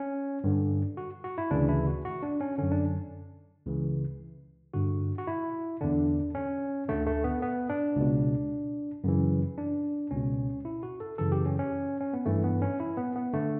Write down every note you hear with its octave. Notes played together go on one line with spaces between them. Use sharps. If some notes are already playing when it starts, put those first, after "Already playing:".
Already playing: C#4
G2 D3
F#4
F#4
E4
D2 C#3 E3 D4
E4
F#4
F#4
D4
C#4
F#2 D3 C#4
D4
C#2 C#3 E3
G2 D3 F#4
F#4
E4
E2 D3 D4
C#4
D2 D3 A3
A3
B3
B3
D4
C#2 B2
F#2 C#3 E3
D4
C#2 B2 C#4
E4
F#4
A4
F#2 C#3 E3 A4
G4
C#4
C#4
C#4
B3
G2 E3 A3
B3
C#4
E4
B3
B3
D3 A3